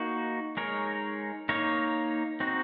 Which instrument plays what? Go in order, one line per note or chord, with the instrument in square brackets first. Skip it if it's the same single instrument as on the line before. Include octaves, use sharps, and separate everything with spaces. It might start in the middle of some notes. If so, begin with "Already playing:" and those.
Already playing: [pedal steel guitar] A#3 D#4 F#4
G#3 D#4 A#4 C#5
A#3 D#4 A#4 C#5
C4 D#4 F#4